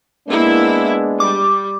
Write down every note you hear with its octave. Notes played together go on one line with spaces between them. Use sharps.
G#3 A#3 B3 D4 E4
G3 D6